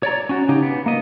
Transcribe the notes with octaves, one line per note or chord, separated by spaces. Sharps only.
C#5 D5 A#5
C#4 F#4
C#3 D#4 G4
B3
A#3 D#5